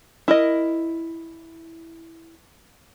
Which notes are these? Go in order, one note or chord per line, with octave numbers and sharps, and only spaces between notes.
E4 A#4 D#5